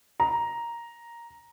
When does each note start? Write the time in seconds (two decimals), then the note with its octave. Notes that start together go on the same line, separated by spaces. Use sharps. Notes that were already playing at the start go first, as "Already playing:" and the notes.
0.20 A#5